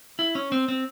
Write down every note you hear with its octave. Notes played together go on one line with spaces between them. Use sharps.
E4
C#4
C4
C4